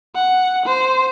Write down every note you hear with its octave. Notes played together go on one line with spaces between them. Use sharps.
F#5
C5